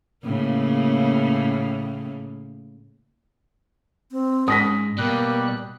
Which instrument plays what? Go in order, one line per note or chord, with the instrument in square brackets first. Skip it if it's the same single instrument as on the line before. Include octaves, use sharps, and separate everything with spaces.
[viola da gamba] A2 C#3 A#3
[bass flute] C4
[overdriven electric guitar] G#2 [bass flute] C#4 [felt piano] D#6 A#6 B6
[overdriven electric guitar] B2 [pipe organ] G3 F#6 [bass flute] A#3